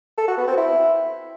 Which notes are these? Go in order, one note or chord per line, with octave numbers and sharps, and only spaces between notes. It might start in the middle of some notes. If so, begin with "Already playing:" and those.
A4
F#4
B3
C4
E4